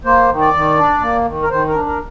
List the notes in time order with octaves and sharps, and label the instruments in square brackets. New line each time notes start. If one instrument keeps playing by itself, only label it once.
[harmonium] A#3 C5
D#3
D5
D#3
D4
A#3
D#3
A#4
D#3 C5
A#4
D4
A#4